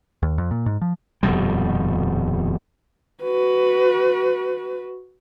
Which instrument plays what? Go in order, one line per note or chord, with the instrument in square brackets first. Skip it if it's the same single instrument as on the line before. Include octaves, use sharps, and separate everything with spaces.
[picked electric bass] D#2
F2
A#2
G#2
F3
[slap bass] D#1 F2 B2 G3
[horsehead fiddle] F#4 B4